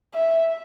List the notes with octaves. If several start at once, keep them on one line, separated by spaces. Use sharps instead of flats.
E5